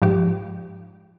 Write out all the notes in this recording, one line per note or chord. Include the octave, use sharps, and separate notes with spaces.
G#2 F3 G4